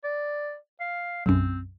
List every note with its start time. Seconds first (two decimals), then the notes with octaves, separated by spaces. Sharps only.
0.04 D5
0.80 F5
1.26 B1 F#2 C4